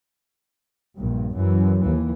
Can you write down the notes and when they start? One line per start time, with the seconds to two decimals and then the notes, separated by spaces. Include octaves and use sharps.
0.96 A#1 G2
1.35 F#2 E3
1.80 D#2 E3